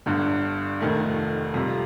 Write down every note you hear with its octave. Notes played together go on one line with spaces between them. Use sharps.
G1 G2 D3
F1 F2 D#3 A3
F2 C3 G3